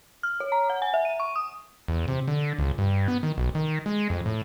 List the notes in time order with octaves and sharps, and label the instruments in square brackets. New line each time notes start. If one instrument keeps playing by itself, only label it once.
[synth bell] F6
C#5
A#5
F#5
G#5
E5
D#7
C#6
D#6
[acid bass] E2
C3
D3
C#2
G2
B3
D#3
B1
D#3
G#3
F2
A2